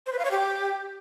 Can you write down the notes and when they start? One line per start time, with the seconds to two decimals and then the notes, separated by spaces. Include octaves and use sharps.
0.06 C5
0.13 B4
0.19 F5
0.25 C#5
0.31 G4